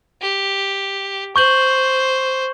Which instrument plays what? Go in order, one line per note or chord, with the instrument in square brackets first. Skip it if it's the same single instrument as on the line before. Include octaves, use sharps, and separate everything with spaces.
[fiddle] G4
[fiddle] C5 [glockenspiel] C#6 G6 F#7